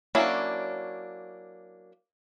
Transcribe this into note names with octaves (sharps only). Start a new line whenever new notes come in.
F#3 A#3 C#4 D4 E4